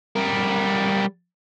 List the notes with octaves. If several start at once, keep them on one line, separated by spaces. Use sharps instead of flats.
G3 A#4